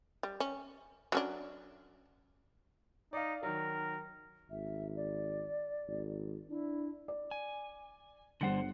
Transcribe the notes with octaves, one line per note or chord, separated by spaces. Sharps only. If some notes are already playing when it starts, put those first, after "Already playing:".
G3
C#4
F#3 C#4 D4
D#4 D5 F5
D#3 F#3 A#4
G#1 E5
D5
G#1
D4 E4
D5
G#5
G1 D3 G3 C5 F#5 C#7